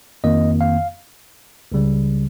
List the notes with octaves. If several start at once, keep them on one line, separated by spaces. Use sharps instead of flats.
F2 D#3 A#3 D#5
F5
C#2 C#3 G3